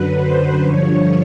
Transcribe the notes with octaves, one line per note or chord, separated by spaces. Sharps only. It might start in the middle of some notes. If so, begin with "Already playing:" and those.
Already playing: F#2 D3 F#3 B4
C5
G2 D3 F3 C#5